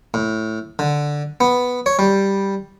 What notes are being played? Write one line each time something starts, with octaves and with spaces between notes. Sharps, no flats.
A2
D3
B3
C#5
G3